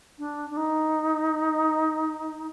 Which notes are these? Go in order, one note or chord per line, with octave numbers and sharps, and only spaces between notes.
D4
D4
D#4